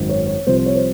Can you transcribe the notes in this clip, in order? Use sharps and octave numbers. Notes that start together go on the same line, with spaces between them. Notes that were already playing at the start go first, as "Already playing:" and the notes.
Already playing: G#1 F#2 D#3
C#5
C#5
C2 C3 F3 C5
C5
C#5
C5